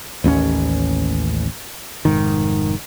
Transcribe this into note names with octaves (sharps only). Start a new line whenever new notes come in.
A1 D#2 C4 C#4
F1 G#2 D#3